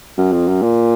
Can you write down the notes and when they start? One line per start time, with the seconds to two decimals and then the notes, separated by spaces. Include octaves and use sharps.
0.18 F#2
0.32 F2
0.48 F#2
0.63 A#2